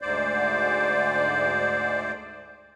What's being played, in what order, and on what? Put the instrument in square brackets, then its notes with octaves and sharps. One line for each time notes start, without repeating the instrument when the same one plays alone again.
[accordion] D2 G#2 C5 D5